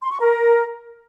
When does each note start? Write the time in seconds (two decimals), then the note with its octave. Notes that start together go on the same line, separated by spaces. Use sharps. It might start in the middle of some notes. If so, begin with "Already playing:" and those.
0.02 C6
0.11 C#6
0.20 A#4